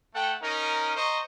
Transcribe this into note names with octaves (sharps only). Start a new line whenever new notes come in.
A3 A4 F#5 G5
C#4 D#4 A#4
C5 D#5 A#5 C#6